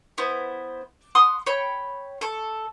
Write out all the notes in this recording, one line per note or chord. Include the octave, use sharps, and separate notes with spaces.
B3 E4 C5
F#5 C6 D#6
C#5 G5 B5
A4 C#6